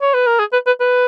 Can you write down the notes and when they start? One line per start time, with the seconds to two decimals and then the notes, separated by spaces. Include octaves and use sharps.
0.02 C#5
0.14 B4
0.27 A#4
0.39 G#4
0.53 B4
0.67 B4
0.81 B4